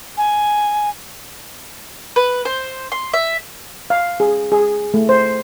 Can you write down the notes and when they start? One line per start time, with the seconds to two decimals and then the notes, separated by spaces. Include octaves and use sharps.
0.17 G#5
2.16 B4
2.45 C5
2.92 C6
3.13 E5
3.90 F5
4.20 G#4
4.52 G#4
4.94 A3
5.09 C5